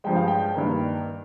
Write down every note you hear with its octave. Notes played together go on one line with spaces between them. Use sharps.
G2 F3 G#3 G5
F5
G5
G2 D#3 A#3